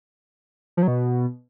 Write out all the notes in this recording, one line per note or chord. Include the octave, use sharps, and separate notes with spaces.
F3
F#3
B2